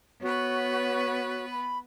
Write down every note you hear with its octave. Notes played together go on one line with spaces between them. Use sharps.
B3 F#4 B4 C#5
B5